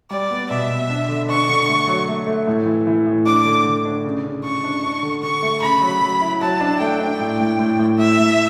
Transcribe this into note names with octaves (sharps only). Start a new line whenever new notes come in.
G3 D5
B3
B2 E5
B2
D4
D3
D4 C#6
D3
A3
F#3
A3
A3
A2
E3
E3
A2
D4 D6
D3
D3
D4
C#3
C#3
C#3 C#6
D4
D4
D3
D3 C#6
A3
C#3 B5
F#3
F#3
E4
F#3 A5
D4
A3 G5
D4
A2
A2
A2
A2
A2 E5
A2